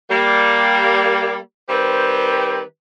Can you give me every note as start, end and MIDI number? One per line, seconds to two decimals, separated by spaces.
0.11 1.37 55
0.11 1.37 58
1.69 2.61 51
1.69 2.61 55
1.69 2.61 60
1.69 2.61 67
1.69 2.61 71
1.69 2.61 72